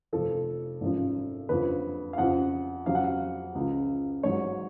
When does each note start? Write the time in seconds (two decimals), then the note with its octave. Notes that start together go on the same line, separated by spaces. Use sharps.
0.13 F1 F2 F3 A4
0.81 G#1 F#2 F3
1.49 F#1 F2 D3 F3 B4
2.13 F5
2.18 F2 C#3 F3 F#5
2.86 F2 C#3 F#3 F5
2.95 F#5
3.04 F5
3.55 C#2 C#3 F3
4.23 G#1 G#2 F#3 C#5